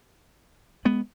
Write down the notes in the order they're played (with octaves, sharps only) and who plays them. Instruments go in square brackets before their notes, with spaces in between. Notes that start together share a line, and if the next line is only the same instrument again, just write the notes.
[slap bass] G#3 B3